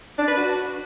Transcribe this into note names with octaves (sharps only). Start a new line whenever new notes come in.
D4
B4
F#4